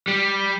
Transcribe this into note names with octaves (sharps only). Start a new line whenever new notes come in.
G3